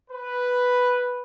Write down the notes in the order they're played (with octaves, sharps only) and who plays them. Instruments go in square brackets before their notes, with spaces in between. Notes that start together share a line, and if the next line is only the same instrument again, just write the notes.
[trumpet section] B4